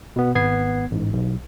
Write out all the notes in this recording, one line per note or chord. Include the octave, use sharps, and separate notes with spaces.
B2 B3
G#1 B3 G#6 C7
A1 G#2
B1